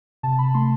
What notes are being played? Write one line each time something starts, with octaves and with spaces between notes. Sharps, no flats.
C3 A5
B5
A3 C6